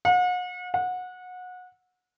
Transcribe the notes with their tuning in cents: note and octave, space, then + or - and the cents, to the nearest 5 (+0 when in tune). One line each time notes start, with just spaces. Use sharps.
F#5 -40
F#5 -25